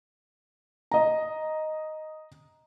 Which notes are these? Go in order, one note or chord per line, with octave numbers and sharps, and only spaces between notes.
D#5 A#5